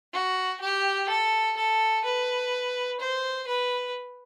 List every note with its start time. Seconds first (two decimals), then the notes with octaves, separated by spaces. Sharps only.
0.13 F#4
0.60 G4
1.09 A4
1.57 A4
2.04 B4
3.00 C5
3.47 B4